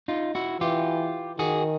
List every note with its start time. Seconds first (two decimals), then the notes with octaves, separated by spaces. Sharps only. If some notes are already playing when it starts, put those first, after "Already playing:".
0.08 D#4 F4
0.35 E4 F#4
0.60 E3 F4 G4
1.38 D#3 F#4 G#4